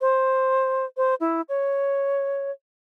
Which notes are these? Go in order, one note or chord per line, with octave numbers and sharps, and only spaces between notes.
C5
C5
E4
C#5